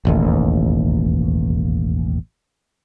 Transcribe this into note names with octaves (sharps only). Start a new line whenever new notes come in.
E1 A1 D#2